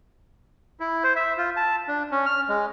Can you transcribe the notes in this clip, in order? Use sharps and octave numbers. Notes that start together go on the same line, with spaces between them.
E4
C5
E5
F4
A5
D4
C#4
F6
G#3